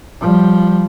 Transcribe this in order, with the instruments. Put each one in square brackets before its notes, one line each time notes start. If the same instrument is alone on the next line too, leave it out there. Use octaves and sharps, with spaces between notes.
[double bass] F3 G3